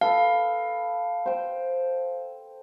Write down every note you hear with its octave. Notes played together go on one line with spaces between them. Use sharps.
A4 B4 F5
C5 G5